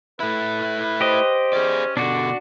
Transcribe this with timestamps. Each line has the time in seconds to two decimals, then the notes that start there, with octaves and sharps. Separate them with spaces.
0.20 A3 E4 B4
1.01 G4 C5 D#5
1.53 C#4 G#4 D5
1.97 B2 D3 D4 F#4 D5